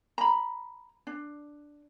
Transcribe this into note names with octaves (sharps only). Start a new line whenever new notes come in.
A#5 B5
D4